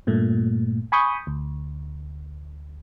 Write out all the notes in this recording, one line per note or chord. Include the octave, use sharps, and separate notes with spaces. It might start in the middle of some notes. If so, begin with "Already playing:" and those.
G2 A#2 A3
G#5 B5 C#6 D#6 G6
D2